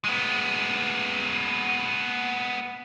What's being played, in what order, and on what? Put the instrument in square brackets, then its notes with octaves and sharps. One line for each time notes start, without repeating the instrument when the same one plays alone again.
[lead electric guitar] G#3 B3